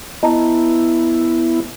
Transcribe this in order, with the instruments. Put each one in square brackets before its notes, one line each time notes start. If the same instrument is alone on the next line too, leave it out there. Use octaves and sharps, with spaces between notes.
[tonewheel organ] B3 E4 [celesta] D#5 A5 A#5